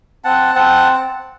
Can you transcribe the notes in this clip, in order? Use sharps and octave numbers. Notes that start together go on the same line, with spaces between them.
C4 F#5 A5
C4 F#5 A5